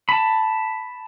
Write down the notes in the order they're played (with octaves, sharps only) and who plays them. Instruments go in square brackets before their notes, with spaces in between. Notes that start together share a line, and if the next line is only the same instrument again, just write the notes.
[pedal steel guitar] A5 B5